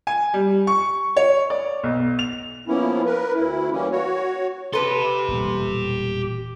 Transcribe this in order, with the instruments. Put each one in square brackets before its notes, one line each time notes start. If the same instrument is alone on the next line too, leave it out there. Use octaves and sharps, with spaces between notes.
[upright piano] G#5
G3
C#6
C#5
D5
B1
F7
[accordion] F3 A#3 B3 C#4 E4
A#4 B4
D2 E4
E3 G3 A#3 C#4
F#4 C#5
[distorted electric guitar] G4 C6 [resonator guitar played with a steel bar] A4 B4
[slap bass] E1 A#2 G3